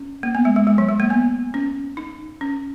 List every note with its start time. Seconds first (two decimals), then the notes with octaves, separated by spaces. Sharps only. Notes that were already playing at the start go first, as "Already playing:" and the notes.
Already playing: C#4
0.23 A#3
0.35 B3
0.45 G#3
0.56 G#3
0.67 G#3
0.78 F#3
0.89 G#3
1.00 A#3
1.10 B3
1.54 C#4
1.97 D#4
2.41 C#4